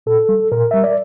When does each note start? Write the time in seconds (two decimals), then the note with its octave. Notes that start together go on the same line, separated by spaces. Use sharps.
0.06 A#2 A4
0.29 G3
0.52 A#2 A#4
0.71 G3 E5
0.84 D5